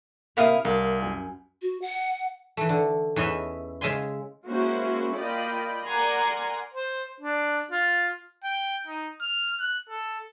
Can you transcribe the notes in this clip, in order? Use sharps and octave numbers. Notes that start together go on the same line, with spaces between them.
C3 A#3 E4 A#4 F5 D#6
C2 A#4 F5
F#2 G#5
F#4
F#5
E3 A3
D3
E2 E3 C#4 D#5 E5
C#3 G#3 E5 F5 G#5 C6
G#3 A#3 C#4 E4 F#4 C5
A#3 F4 D5 D#5 G5 B5
A#4 D5 F#5 G#5 A#5 C6
C5
D4
F4
G5
D#4
F6
F#6
A4